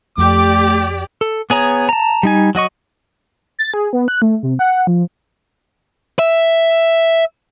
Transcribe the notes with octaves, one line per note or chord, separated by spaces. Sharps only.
F2 A3 G4 D5 D6
A4
B3 G#4 C#5 A#5
A5 A#5
G3 D#4 G#5
F#3 F#4 D#5 C#6
A6
G#4
B3
F#6
A3
C3
F#5
F3
E5